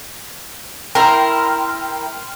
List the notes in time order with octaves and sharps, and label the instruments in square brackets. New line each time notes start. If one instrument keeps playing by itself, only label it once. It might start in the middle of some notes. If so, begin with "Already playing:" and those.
[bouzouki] E4 A#4 [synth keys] G5 C6 F6